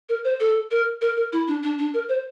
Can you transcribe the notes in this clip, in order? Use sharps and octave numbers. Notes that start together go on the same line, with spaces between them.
A#4
C5
A4
A#4
A#4
A#4
E4
D4
D4
D4
A#4
C5